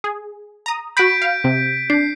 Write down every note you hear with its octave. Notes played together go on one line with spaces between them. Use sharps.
G#4
A#5 D#6
F#4 B5 G6 B6 D7
F5
C3
D4 C7